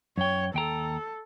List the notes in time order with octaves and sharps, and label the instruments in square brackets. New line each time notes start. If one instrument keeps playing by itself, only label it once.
[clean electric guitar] F#2 G5 [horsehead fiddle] C#5
[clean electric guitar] D#2 G5 A#5 [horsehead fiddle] A4